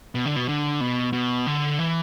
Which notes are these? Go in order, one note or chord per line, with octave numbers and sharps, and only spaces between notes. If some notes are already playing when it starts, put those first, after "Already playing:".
B2
D3
B2
D3
B2
B2
D3
E3